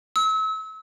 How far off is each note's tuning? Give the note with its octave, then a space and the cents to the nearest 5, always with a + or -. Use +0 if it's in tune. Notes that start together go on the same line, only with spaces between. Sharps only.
E6 -35